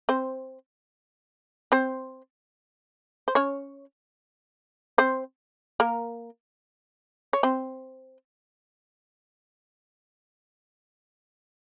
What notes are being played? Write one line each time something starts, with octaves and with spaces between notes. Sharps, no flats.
C4 C5
C4 C5
C5
C#4 C#5
C4 C5
A#3 A#4
C#5
C4 C5